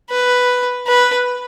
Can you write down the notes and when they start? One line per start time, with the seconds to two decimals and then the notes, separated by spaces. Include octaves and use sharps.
0.10 B4
0.87 B4